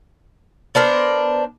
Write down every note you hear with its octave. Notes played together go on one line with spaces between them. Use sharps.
B3 D4 A#4 C5